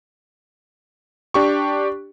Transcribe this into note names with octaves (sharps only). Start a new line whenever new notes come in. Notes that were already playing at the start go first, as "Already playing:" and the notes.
D4 G4 C#6